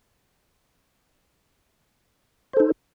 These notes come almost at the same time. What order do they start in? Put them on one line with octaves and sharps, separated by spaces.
C5 A4 D#4